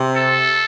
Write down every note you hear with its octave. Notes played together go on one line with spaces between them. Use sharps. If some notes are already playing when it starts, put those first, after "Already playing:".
Already playing: C3
A4